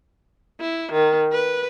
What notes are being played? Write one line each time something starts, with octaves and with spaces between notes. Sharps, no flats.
E4
D#3
B4